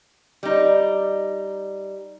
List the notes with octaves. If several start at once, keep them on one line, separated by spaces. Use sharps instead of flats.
G3 D#4